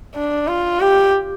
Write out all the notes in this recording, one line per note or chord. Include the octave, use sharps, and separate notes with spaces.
D4
F4
G4